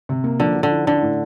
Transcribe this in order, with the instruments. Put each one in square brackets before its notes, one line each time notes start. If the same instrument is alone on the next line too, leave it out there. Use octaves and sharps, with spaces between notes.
[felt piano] C3
A#3
[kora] D3 [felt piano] F3
[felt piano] F3
[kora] D3
[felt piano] E4
[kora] D3 [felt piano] D4
[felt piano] A2